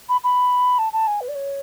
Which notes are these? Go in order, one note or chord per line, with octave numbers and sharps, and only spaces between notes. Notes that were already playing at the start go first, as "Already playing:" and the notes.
B5
B5
A5
A5
G#5
B4
D5
C#5